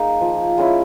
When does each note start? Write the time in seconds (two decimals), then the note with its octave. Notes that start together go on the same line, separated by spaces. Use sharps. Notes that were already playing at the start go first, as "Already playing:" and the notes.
Already playing: A#3 D#4 G#4
0.21 F3
0.58 G#3 C#4 E4